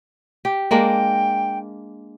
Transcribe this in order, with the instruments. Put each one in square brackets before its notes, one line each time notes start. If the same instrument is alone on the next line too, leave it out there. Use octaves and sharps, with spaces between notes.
[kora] G4
[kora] G#3 A#3 D4 [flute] G5